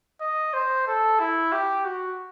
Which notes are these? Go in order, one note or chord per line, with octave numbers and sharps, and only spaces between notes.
D#5
C5
A4
E4
G4
F#4